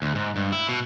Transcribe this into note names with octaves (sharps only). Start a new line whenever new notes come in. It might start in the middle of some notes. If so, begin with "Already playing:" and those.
D2
G#2
G2
E4
B2